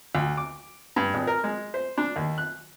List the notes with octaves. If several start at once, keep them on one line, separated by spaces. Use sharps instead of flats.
D2
D6
G2
G#1
A#4
G#3
C5
D4
D#2
F#6